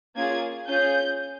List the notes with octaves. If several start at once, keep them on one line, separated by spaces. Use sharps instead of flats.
A#3 C#4 F4 G#4 G#6
C#4 F4 G#4 G6